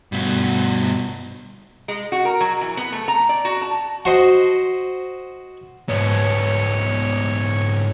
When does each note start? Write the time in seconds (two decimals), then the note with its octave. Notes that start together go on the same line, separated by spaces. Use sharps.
0.12 G2 B2
1.88 G#3
2.12 F#4
2.25 A#4
2.41 F#3
2.61 E3
2.77 B3
2.92 A3
3.08 A#5
3.29 D5
3.45 F#4
3.61 A5
4.05 F#4 C5 D#5
5.89 G#2 B3 C#5